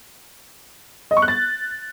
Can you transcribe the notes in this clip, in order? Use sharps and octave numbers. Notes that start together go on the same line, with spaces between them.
D#5
C#6
F#6
A6